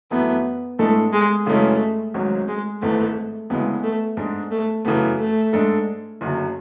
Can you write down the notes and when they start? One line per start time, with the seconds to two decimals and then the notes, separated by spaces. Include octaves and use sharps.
0.11 F#2 E3 A3 B3 E4
0.79 A2 G#3 A3 D4 A4
1.13 G#3
1.46 F#2 C#3 E3 G#3 A3 C#4
2.14 G#1 G#2 F#3 C#4
2.48 G#3
2.82 G#1 G#2 E3 A3 B3
3.50 D2 C#3 E3 G#3 B3
3.84 A3
4.17 G#2 G#3 D4
4.51 A3
4.85 F#2 C#3 E3 A3 B3
5.19 A3
5.53 G#2 G#3 D4 A4
6.21 F#1 F#2 D3